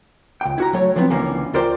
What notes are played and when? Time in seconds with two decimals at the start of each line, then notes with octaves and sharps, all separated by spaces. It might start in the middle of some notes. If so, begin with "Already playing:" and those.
0.41 C#2 G5
0.58 E4 F#4 A#5
0.73 F#3 A3 C#5
0.96 D3 F3 F#3 B3 C4 D4
1.10 C#2 D3 E3 A#3 C#4
1.54 D2 F4 A#4 C5 D5 G5